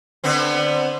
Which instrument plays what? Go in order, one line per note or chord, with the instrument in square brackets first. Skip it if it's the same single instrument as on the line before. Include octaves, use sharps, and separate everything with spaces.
[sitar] D3 B3 C4